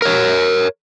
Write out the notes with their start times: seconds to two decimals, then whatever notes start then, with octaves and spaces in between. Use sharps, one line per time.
0.02 A#4 C#5